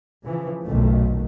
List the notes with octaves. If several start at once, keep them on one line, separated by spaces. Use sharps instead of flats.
C#3 E3 F3
F#1 B1 A#2 D#3 A3